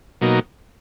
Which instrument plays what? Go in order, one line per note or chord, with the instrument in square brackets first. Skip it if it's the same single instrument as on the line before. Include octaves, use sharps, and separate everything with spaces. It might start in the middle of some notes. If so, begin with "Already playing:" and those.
[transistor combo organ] B2 F#3 A#3 D#4